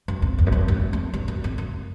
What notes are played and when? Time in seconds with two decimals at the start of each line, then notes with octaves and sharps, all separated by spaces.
0.08 F#2
0.22 F2
0.38 E2
0.47 F#2
0.52 F2
0.68 G2
0.74 F#2
0.93 F2
1.14 G2
1.28 F#2
1.44 F2
1.58 F#2